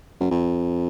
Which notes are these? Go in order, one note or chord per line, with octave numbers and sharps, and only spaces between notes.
F#2
F2